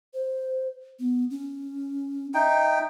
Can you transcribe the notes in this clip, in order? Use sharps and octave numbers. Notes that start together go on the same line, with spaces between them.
C5
B3
C#4
D#4 E5 G5